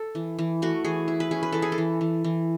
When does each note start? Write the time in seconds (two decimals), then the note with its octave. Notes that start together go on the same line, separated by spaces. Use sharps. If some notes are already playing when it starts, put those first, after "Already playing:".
Already playing: A4
0.15 E3
0.39 E3
0.62 A3 F#4
0.85 E3 G#4
1.08 E4
1.20 B4
1.31 C#4 G#4
1.43 B4
1.52 E3 A4
1.62 G#4
1.72 A4
1.78 E3
2.01 E3
2.24 E3